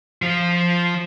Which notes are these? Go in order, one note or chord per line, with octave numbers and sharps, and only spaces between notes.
F3 F4